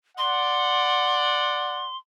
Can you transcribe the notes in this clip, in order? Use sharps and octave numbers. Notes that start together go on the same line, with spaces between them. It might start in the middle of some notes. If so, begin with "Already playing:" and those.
D5 F#5 C6